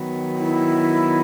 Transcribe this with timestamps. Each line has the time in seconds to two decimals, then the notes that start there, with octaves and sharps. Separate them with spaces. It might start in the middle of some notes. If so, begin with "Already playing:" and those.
Already playing: D#3 F#3 B3
0.37 E4